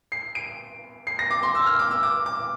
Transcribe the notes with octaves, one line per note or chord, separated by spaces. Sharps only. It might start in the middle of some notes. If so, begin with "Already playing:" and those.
C7
D7
C7
A#6
D6
C6
E6
F6
D6
E6
D6
D6